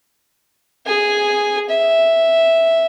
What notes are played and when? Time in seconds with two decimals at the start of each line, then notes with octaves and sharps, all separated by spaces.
0.86 G#4 G#5
1.70 E5